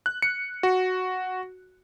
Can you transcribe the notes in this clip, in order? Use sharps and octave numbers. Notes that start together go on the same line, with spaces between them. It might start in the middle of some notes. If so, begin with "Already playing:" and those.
F#6
C#7
F#4